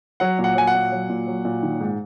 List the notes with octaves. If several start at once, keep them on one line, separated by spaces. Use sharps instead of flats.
F#3 F#5
A#2
F#5
F#3 G#5
F#5
A#2
F#3
A#2
F#3
A#2
D#3
G#2